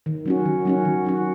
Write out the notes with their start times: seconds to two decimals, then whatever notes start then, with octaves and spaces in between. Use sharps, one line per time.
0.06 D#3
0.26 F#3 C#4 F#4
0.46 D#3
0.65 F#3 C#4 F#4
0.85 D#3
1.05 F#3 C#4 F#4